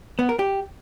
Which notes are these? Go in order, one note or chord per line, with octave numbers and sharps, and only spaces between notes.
B3
A#4
G4